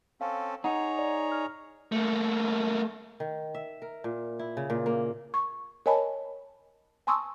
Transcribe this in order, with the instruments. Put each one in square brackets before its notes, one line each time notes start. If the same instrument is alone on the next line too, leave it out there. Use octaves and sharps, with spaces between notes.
[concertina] C4 C#4 A4 [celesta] F5
[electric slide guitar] D#4 [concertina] G#4 C#5 A#5 [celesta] F#5
[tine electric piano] D5
[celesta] F6
[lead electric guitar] A3 A#3
[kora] D#3
E5
A#4
A#2
E4
C#3
A#2
A#3
[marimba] C#6
A#4 C#5 D#5 G#5 A5 B5
G#5 A5 C6 C#6 D#6 E6